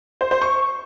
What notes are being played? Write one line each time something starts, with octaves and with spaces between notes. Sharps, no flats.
C5
C5
C#6